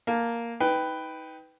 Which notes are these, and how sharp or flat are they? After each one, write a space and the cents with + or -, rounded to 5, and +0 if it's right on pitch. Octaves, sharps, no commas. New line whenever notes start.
A#3 +0 A5 +0
D#4 +30 B4 +10 G5 +0